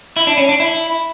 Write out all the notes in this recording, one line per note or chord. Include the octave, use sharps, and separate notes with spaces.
E4
D4
C#4
D4
E4